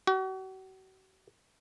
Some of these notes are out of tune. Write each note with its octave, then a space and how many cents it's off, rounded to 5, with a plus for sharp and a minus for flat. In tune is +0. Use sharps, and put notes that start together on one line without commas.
F#4 +40